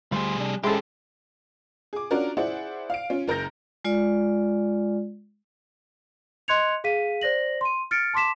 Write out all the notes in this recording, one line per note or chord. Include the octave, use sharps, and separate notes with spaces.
D2 G3 F4 G#4 C5
C2 D4
G#3 C#4 E4 G4 A4 C5
G#4 D6
C#4 D4 F4 F#4 A#4 D5
E4 G#4 C5 D5 E5 F#5
F5 D7
C#4 F4
F#1 A#4 A#5 G6 A#6
G#3 F4 D5
D#5 C6 F#6 G#6 C#7 F7
G#4 F5 B6 D#7
C5 D5 A#6 F#7
C6 D#7
F6 A6 C#7 D7
A5 C6 D6 B6 E7